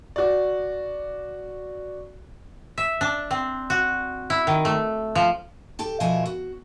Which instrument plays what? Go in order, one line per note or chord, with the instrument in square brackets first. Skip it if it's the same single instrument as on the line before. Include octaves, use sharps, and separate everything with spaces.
[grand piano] F#4 D5
[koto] E5
D4
C4
F#4
E4
D#3
A3
F3
[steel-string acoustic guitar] G4 A4 G5
B2 F3 A#4 E5 G#5
F#4